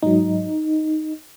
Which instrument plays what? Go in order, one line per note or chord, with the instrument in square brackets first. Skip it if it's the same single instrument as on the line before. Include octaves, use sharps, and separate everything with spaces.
[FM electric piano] G#2 F#3 D#4